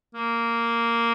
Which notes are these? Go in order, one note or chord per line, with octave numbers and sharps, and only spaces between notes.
A#3